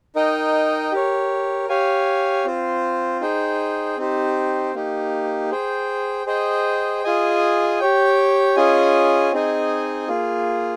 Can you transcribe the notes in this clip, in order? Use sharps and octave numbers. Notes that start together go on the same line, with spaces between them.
D#4 A#4 D#5 G5
G4 A#4 C#5
G4 C#5 F5 G#5
C4 F4 C5
D#4 G#4 C5 G5
C4 D#4 G4 C5
A#3 D#4 G4
G#4 C5 G5
G#4 C5 D#5 G5
F4 G#4 D#5 G#5
G4 C#5 G5
C#4 F4 G#4 D#5 G#5
C4 D#4 G#4 D#5 G#5
A#3 F4 G#4